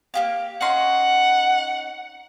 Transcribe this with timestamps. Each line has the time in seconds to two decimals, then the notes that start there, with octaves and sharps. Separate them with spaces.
0.14 A#3 G4 F5
0.61 C#4 D#4 F#5 C6